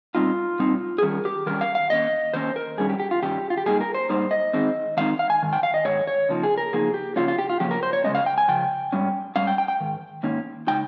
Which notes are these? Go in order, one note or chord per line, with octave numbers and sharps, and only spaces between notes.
A#2 G3 C4 D#4 F4
A#2 G3 C4 D#4
G#4
D#3 G3 C#4 A#4
G4
D#3 G3 C#4 A#4
F5
F5
D#3 A#3 C#4 D#5
D#3 A#3 C#4 C5
A#4
G2 D#3 G3 C#4 G#4
G4
G4
F4
G2 D#3 G3 C#4 G4
F4
G4
G#2 G3 A#3 D#4 G#4
A#4
C5
G#2 G3 A#3 D#4 C5
D#5
D#3 G#3 C4 D#4
D#3 G#3 C4 D#4 F5
F5
G#5
G#2 D#3
G5
F5
D#5
G#2 D#3 C#5
C#5
C#3 F3 A#3 D#4
G#4
A#4
C#3 F3 A#3 D#4 G#4
G4
C#3 F3 A#3 C#4 F4
F4
G4
F4
C#3 F3 A#3 C#4 G4
A#4
C5
C#5
C#3 F3 G#3 C#4 D#5
F5
G5
G#5
C#3 F3 G5
G#2 G3 C#4
G#2 G3 C#4 F5
G5
G5
G5
G#2 D#3
G#2 D#3 A#3 C#4
C#3 G#3 D#4 G5